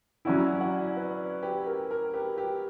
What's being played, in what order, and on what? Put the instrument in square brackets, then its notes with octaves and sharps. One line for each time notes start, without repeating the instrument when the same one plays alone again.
[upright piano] F#3 C#4 E4 [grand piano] D5 F#5
[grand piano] D5 F#5
B4 D5
G4 B4
A#4
A#4
G4 B4
G4